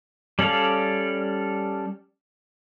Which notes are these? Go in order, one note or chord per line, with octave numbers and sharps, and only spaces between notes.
G3 C#4 A4 D5 F5